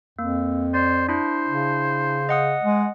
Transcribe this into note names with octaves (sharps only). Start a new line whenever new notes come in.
F2 A#3
C5 D5
D4 E4 C5
C#3
D#5 F#5 D#6
G#3